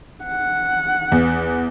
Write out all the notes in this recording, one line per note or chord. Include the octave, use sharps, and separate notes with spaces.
F#5
E2